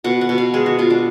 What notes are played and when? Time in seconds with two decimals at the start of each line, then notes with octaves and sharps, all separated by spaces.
0.04 B2 F#5
0.21 F#5
0.29 B2
0.38 F5
0.54 G#3 G#4
0.66 F#4
0.79 B2 F4
0.90 D4